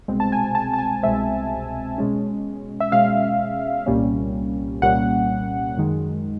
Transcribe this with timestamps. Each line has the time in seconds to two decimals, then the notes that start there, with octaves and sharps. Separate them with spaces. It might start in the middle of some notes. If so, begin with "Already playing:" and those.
0.08 C2 B2 G#3 C4
0.20 A5
0.32 G#5
0.55 A5
0.74 A5
0.79 G#5
1.03 C2 B2 G#3 C4 E5
1.98 B2 G#3 C#4
2.80 E5
2.92 B2 G#3 C#4 F5
3.86 C2 A#2 G3 A#3 C#4
4.82 C2 A#2 G3 A#3 C#4 F#5
5.77 F#2 D#3 G#3